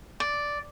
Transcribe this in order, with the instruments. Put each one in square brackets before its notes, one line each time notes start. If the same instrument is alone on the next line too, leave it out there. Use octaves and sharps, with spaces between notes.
[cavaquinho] D5